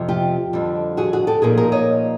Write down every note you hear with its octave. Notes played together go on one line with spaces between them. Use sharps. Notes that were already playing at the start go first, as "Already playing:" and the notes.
Already playing: F2 C3 F3
F4 G4
F2 D3 G3
F#4 G#4
F#4 G#4
G4 A4
A#2 F3 A#3 D#4 G#4 A#4
G#4 A#4
C#5 D#5